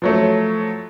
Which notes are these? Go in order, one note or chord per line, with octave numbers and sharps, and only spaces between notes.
F3 F#3 A3